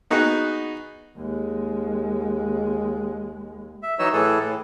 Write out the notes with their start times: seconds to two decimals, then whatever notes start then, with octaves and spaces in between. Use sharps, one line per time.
0.11 B3 D#4 F#4 G#4 B4 F#5
1.18 D#2 G#3
3.83 E5
3.99 E3 F#3 D#4 C#5 D#5 E6
4.13 A2 E3 G#4 A4
4.39 A2